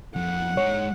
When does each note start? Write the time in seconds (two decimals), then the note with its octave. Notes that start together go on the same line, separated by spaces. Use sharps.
0.16 F2 F#5
0.57 G#3 D#4 C#5